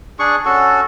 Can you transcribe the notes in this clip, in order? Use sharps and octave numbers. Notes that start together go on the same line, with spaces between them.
D4 G#4 C#6
C#4 F#4 A4